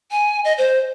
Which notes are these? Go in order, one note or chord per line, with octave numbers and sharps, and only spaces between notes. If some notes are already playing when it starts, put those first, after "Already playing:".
G#5
D#5
C5